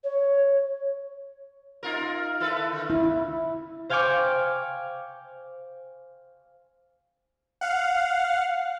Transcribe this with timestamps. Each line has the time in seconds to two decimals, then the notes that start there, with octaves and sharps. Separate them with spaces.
0.04 C#5
1.83 D#4 F4 A#4
2.40 E4 A4 B4
2.72 D3
2.90 E4
3.89 C5 F5 G5 G#5 C#6 D6
7.61 F5 F#5